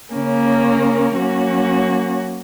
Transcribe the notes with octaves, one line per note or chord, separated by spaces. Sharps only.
C#3 A#3 C#4 A#4
F#3 A#3 C#4 F#4